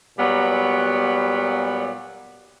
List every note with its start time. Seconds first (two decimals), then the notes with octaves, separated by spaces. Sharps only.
0.18 A#2 F#3 G3 B3